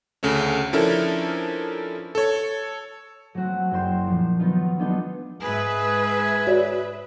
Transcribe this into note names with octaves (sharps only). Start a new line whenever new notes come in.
D2 C#3 A3 C#4
F3 C#4 D4 E4 A4 A#4
A4 C#5
F#3 A3 C4 F#4
F#1 A#4 G5 C6 E7
A#2 F3
D#3 F#3 B3 D#4 F4
G#3 B3 D4 D#4 F4 A4
G#2 G#4 B4 E5
F#4 C#5 D5